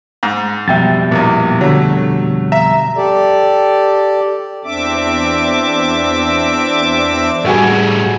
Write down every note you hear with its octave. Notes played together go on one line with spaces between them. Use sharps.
G#2
F2 B2 G3 E5 G5 A6
A#1 E2 A#2
D3 F#3 A3
E5 A#5
G4 A4 D5
E2 C4 D4 E5 D6
A2 G3 A3 F#4 G#4